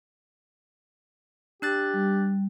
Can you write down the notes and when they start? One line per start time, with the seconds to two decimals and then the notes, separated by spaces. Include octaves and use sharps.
1.62 D4 G4 F#6 A6
1.93 G3